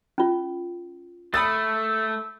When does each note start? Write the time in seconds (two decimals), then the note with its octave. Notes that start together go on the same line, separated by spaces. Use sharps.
0.18 C#4 F4
1.34 A3 B5 D#6 E6 A6